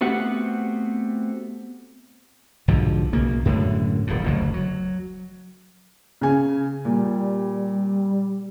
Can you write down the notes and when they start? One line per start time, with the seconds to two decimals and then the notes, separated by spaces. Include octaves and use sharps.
0.01 A3 B3 C4 F#4 G4 F#5
2.68 B1 G#2 D3 F3
3.13 B1 C#3 A#3
3.45 F#2 A2 D3 G#3
4.07 D#1 A2
4.24 F#1 D2 F#3
4.54 F#3
6.21 C#3 G#5
6.85 A#2 G3